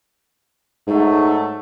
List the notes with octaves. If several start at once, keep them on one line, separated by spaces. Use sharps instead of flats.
G#2 F#3 A3